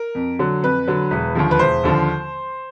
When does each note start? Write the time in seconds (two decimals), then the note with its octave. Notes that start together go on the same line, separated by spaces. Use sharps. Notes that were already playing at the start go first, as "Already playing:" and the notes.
Already playing: A#4
0.15 F2
0.39 D3 F#3
0.63 F2 B4
0.88 D3 F#3
1.11 E1
1.35 D#2 D3 F3
1.51 B4
1.59 E1 C5
1.83 D#2 D3 F3